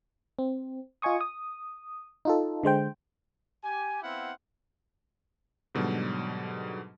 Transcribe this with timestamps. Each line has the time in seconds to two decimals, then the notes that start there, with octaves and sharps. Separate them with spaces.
0.39 C4
1.02 F4 D#5 G#5 C#6 D#6
1.21 D#6
2.25 D#4 F4 A4
2.63 D3 G#3 C5 G5
3.64 G4 G#5
4.03 B3 C4 E4 F5 F#5
5.75 G#2 B2 D3 F#3 G3